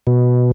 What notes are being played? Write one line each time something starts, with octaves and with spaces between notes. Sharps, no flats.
B2